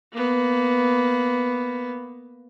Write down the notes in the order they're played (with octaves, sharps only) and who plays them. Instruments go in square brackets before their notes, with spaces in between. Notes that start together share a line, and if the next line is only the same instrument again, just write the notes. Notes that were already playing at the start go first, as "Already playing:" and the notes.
[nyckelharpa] A#3 B3